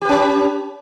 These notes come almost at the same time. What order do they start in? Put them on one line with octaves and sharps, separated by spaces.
G4 B4 C#4